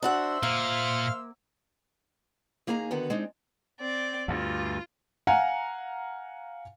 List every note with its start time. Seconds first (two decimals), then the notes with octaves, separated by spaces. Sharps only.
0.02 D4 F#4 C5 E5 F#5 E6
0.43 A#2 A#3 F5 F6
2.67 D#2 A#3 D#4 G#4 G#5 A#5
2.91 D3 D#3 B3 F#4
3.10 G#3 C4 D4 D#4
3.79 C4 D5
4.28 D2 G2 F4
5.27 F5 F#5 G#5 A#5